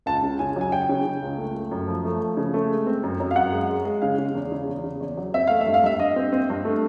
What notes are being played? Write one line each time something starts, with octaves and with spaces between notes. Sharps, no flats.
C#2 A5
C#3
C#3 G#5
F#3 G#5
F#3 G5
C#3
C#3
C#2
A3
A3
F#2
F3
A3
F3
C#3
A3
G#3
C4
F#2
F#2
F5
F#2 F#5
G#3
G#3
G#3
C#3 F5
C#3
E2
C#3
E2
C#3
E2
F#3
C4 E5
A3 F5
E5
G2
F5
G2 E5
G2 D#5
C4
C4
G2
A3